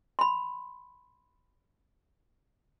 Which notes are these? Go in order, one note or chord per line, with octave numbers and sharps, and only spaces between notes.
B5 C6